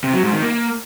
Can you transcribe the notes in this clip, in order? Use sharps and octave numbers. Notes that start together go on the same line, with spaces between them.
C3
F#3
G#2
D#3
A#3